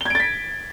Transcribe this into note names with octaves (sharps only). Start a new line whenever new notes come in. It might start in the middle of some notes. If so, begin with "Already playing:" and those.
G#6 A6 B6 D7 G7